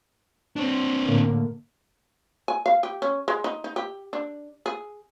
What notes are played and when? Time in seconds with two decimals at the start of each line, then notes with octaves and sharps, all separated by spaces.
0.56 C4 D4
1.03 A2 D3 A#3
2.48 G#5
2.66 F5
2.83 G4
3.02 C#4
3.28 G#3
3.44 D#4
3.64 D#4
3.76 G4
4.13 D4
4.66 G#4